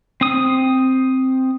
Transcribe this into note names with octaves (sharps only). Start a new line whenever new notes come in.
C4 D#6